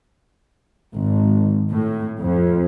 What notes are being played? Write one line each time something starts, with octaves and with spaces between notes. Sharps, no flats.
G#1
A2
F2